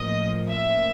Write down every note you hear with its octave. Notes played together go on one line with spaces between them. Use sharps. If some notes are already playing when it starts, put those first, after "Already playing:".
Already playing: A1 A2 F3 A#3 D#5
E5